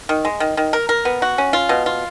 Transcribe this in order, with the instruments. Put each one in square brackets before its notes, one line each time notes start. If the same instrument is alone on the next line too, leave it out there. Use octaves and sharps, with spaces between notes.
[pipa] D#3
G#3
D#3
D#3
A#4
A#4
B3
F#4
C#4
F4
B2
F4